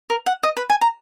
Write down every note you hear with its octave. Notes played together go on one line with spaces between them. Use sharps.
A#4
F#5
D#5
B4
G#5
A#5